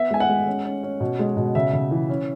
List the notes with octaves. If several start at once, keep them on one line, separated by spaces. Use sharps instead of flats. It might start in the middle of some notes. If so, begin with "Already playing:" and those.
Already playing: B3 E5
G#3 G#5
F#5
G#3
C#4
C#4
C#4
B2
G#3
B2
C#3 E5
C#3
E3
C#4